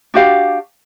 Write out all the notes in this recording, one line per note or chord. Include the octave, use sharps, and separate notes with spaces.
D4 F#4 G4 F5